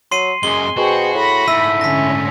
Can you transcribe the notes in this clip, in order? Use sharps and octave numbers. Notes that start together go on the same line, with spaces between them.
F#3 C6 C7 D#7
F#2 G#3 G#4 G#5 C6 G7
B2 F#4 G#4 C5 G5
A2 B5 A#6
G#2 A3 E4 E6 B6 D#7
D3 C#4 A#6 B6